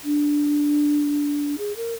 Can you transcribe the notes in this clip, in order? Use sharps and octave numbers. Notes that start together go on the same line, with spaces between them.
D4
G#4
A#4